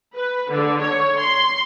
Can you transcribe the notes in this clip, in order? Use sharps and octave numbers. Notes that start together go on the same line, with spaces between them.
B4
D3
C#5
C6